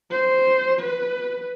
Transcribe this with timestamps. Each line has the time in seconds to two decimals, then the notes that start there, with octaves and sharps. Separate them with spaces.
0.11 C5
0.80 B4